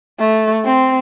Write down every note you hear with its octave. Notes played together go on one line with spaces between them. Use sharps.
A3
C4